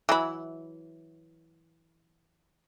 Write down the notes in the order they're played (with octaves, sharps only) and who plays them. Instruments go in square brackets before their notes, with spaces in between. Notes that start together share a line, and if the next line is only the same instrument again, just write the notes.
[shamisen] E3 F#3 E4